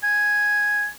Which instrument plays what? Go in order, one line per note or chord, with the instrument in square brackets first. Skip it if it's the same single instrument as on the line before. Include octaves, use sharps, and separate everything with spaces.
[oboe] G#5